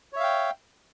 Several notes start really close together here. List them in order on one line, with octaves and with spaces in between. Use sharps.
C#5 E5 F5 G5